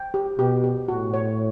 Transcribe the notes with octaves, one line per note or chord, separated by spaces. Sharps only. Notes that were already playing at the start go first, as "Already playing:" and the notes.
Already playing: G5
G4
B2 G4
G4
A2 F#4
C#5